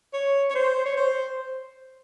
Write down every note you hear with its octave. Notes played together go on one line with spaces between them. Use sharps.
C#5
C#5
C5
C#5
C5